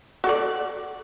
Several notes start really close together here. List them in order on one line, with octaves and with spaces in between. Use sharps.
F#4 A4 D5